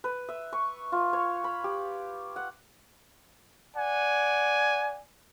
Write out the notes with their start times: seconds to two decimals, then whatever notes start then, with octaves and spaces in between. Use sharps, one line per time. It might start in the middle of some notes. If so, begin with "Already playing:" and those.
0.04 B4
0.29 E5
0.53 C#6
0.92 F4
1.13 C#5
1.44 B5
1.64 G4
2.36 F#5
3.77 D5 F#5 G#5